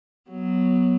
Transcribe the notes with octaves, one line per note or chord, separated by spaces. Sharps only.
F#3 B3